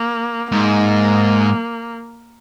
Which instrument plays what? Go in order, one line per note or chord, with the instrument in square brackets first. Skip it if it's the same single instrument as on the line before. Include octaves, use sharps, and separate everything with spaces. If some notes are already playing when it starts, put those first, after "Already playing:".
Already playing: [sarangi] A#3
[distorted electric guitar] G#2 [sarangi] A#3